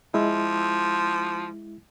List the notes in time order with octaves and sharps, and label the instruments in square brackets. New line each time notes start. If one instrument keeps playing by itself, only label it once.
[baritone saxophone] F3 [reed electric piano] G#3 E4